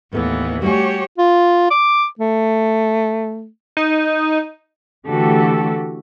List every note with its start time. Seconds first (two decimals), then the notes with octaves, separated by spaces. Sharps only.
0.13 D#2 A2 E3 B3 A4 B4
0.62 G3 A3 F#4 G4 C#5 G#5
1.18 F4
1.71 D6
2.19 A3
3.77 D#4
5.06 D3 E3 A3 F#4 G4 A4